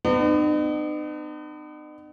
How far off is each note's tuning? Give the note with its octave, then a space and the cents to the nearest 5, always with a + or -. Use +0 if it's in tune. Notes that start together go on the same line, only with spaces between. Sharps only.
B3 +35 D#4 -45